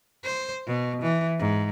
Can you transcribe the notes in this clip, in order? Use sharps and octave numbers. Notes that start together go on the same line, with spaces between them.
C5
B2
E3
G#2